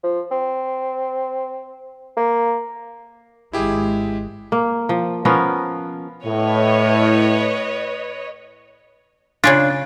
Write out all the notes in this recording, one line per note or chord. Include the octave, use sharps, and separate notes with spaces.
F3
C4
A#3
G#1 G#3 E4 G4 G#4
A#3
F3
F3 B3 C#4 A#4
A2 B4 C#5 D#5
C#3 C#4 D4 F4